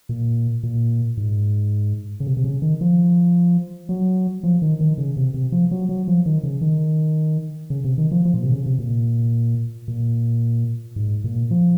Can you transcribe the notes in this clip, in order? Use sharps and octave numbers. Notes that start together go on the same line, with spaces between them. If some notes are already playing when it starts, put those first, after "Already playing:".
A#2
A#2
G#2
C#3
C3
C3
C#3
D#3
F3
F#3
F3
D#3
D#3
C#3
C3
C3
F3
F#3
F#3
F3
D#3
C#3
D#3
C#3
C3
D#3
F3
F3
A#2
C3
C#3
C3
A#2
A#2
G#2
A#2
F3